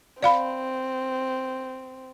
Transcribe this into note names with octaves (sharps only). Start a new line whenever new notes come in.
C4 D5 F5 B5